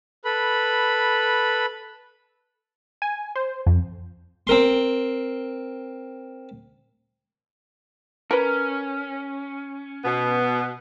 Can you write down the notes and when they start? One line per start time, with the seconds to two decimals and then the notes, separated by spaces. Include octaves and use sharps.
0.25 A4 B4 B5
3.02 G#5
3.35 C5
3.67 F2
4.47 C4 A#4 C6
8.31 C#4 A#4 B4
10.05 B2 B3